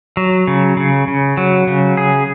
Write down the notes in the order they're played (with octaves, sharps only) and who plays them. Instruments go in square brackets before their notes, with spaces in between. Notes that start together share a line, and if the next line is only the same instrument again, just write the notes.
[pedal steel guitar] F#3
C#3
C#3
C#3
F#3
C#3
G#4